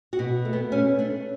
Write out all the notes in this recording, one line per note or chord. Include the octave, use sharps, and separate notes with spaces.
F#4
B2
A3
B3
A3 C#4
A3 D4